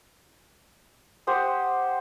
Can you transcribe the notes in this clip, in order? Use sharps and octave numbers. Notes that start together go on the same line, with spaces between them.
G4 C5 F#5 D#6